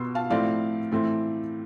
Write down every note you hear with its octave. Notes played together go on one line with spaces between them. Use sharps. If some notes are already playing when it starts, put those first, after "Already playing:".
Already playing: B2 B3 C6 E6
F5 A5
A2 F3 A3 C4 D5 F5
A2 E3 A3 C4